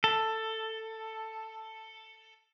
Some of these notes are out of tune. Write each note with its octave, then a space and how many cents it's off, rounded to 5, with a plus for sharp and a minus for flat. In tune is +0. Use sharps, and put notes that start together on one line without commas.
A4 +10